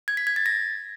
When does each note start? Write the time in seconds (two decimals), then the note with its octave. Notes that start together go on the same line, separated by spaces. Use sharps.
0.08 G#6
0.17 B6
0.27 G#6
0.36 A6
0.46 A#6